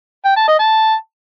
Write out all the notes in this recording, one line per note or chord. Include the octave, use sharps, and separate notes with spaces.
G5
A5
D#5
A5